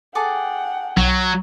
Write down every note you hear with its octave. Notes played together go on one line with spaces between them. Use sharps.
G#4 A4 F#5 G5 D6
B1 F#3 C#5